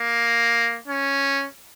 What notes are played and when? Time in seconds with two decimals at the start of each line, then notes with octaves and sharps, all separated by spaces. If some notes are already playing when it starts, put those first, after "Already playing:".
Already playing: A#3
0.88 C#4